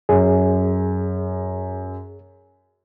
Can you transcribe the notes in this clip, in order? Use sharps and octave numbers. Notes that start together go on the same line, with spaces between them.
F#2 G#4